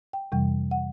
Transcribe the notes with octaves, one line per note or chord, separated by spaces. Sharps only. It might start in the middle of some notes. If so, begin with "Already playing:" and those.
G5
F2 C3 E3 G3 G5
F#5